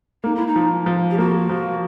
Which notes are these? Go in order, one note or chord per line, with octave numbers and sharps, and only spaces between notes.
A#3 D#4
E4
D#4
F3
F3
G4
A#3 F#4
F3